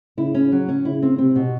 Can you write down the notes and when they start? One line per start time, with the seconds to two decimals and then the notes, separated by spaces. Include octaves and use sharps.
0.18 C#3 E4
0.34 C#4
0.52 F#3
0.69 C#4
0.85 C#3 E4
1.02 C4
1.18 C3 C4
1.36 B2